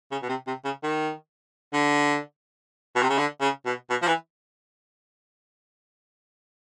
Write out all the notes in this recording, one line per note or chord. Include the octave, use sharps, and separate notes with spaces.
C#3
B2
C3
C3
C#3
D#3
D3
B2
C3
C#3
D3
C#3
B2
B2
F3
E3